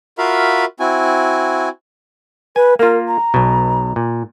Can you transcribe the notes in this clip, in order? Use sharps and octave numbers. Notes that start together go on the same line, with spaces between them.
F4 F#4 A#4 E5 F5 B5
C4 E4 F#4 G#5
B4 G#5
A#3 F4 A#4
A#5
B1 B2
A#2